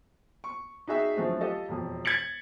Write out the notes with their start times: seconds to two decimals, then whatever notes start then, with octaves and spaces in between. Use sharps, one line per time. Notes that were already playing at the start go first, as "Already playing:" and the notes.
0.44 C#6
0.87 D#4 F#4 G#4 E5 G5
1.16 D3 F3 F#3 A3 C4
1.41 F4 G4 A4 D#5
1.68 E1 F2
2.05 G#6 A6 B6 C#7 F#7